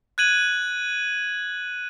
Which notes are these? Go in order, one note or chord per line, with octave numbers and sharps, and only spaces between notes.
F#6 G#6 D#7 F#7